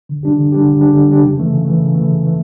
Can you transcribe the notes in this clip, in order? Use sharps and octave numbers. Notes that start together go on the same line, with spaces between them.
D3
G3 D4 G4
D3
G3 D4 G4
D3
G3 D4 G4
D3
G3 D4 G4
C#3
E3 A3
C#3
E3 A3
C#3
E3 A3
C#3
E3 A3